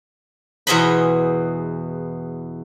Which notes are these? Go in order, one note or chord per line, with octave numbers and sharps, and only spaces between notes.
E2 B2 G#4 C5 D#5 B5